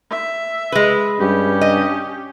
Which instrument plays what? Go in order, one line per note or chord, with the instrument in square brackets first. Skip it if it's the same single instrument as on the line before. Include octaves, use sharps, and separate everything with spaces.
[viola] E5
[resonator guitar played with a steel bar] G#3 B4
[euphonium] G2 [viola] C#4 G4
[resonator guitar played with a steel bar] D#5